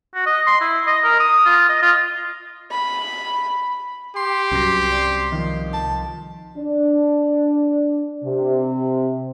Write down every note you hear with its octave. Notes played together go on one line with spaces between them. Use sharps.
F#4
D#5
C6
E4
D#5
A#4
D#6
F4
D#5
F4
B5
G4 C6
C2 F#2 A#6
D5
D#3 F3
A5
D4
C3